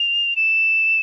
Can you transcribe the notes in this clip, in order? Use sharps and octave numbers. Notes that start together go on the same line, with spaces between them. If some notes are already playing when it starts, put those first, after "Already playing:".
Already playing: F7
E7